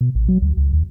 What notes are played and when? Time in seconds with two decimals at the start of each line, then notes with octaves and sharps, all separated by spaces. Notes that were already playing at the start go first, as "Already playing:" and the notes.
0.01 B2
0.15 A1
0.28 F#3
0.42 D2
0.57 C#2
0.73 D#2